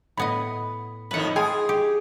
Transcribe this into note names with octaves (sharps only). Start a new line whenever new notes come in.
A2 B3 D#5 B5
F2 A2 D#3 B4 F#5
F4 G#4 G5 G#5 D#6
G4